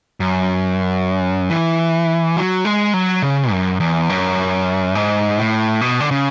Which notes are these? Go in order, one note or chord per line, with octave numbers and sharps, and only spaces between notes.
F#2
E3
F#3
G#3
F#3
C#3
F#2
E2
F#2
G#2
A2
B2
D3
C#3